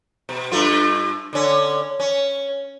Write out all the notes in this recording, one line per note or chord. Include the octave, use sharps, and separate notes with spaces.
B2
G2 A3 F4
D3 C#4
C#4